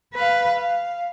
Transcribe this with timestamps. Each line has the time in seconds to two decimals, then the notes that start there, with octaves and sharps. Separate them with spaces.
0.14 B4 F5
0.56 F5